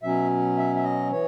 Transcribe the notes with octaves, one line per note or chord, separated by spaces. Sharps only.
B2 F#3 C#4 E5
E5
E5
D#5
E3 C#5